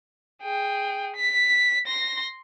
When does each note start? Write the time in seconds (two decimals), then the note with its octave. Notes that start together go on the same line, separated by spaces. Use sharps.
0.43 G#4 G5
1.16 B6
1.87 C6 A#6